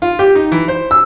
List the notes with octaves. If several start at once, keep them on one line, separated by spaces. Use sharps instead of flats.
F4
G4
D#4
E3
C5
E6